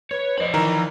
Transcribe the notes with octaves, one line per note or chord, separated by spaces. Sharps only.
B4 C#5
F3 C5 D5 D#5 B5
D#3 E3 A#4 A#5